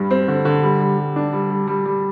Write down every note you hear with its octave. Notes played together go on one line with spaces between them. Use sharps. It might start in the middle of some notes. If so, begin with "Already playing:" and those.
Already playing: G2 G3
C4
D3
D3
G3
G3
G3
D4
G3
G3
G3
G3